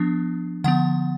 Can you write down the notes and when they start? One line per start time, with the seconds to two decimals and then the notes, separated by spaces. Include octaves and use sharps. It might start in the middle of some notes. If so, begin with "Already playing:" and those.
Already playing: F3 B3 D4
0.64 D3 F3 B3 F#5